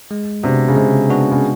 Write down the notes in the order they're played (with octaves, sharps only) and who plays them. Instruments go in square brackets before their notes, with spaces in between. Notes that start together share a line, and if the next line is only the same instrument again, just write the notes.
[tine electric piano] G#3
[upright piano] C3 [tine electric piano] B3 D4 F#4
[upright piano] C#3
[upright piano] C3 [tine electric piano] G#3
[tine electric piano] B3 D4 F#4
[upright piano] C#3